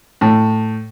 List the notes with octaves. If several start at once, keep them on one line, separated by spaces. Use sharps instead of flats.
A2